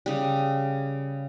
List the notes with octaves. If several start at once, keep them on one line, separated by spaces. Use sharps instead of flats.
C#3 G3